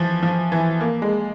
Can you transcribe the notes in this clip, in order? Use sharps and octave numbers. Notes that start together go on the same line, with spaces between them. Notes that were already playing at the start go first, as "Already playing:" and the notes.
Already playing: E3 F3
F3
E3
A#3
G#3